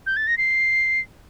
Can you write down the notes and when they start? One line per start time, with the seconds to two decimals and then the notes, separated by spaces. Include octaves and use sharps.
0.06 G6
0.16 A6
0.27 A#6
0.38 C7